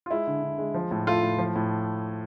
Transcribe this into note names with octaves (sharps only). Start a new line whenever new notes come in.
F4
G#3 E4
D3
D3
G#3
F3
A2
A3 F4
A2
F3
A2